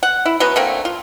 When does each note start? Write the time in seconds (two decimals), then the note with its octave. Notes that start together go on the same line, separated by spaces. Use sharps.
0.03 F#5
0.26 E4
0.40 F#3 B3 C#4 B4
0.56 D3 A3 A#3 C4
0.85 F4